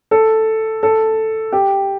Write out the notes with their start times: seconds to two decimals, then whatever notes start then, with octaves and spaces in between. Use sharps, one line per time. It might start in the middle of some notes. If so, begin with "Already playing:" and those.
0.11 A4
0.83 A4
1.52 G4